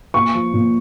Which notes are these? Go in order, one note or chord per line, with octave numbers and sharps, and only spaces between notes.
A#2 C#6
F3
A#2